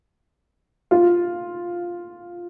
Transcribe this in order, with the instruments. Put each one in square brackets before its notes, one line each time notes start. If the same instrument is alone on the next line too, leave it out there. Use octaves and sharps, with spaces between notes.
[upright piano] F4